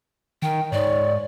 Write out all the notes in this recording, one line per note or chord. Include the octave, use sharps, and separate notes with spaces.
D#3 G5
G#2 C#5 D5